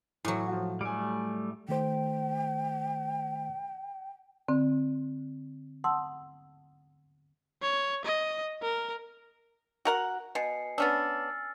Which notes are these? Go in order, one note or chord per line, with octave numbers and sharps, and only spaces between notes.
A2 E3 F#3
F3 F#4
G3 A3 G#5 D7
D#3 A3 C5 G5
D3 C4
F#5 A5 C6 D#6 E6
C#5
D#5
A#4
F#4 A#4 F#5
B2 G#5 C7 C#7
B3 C#4 D4 E6 F6 A6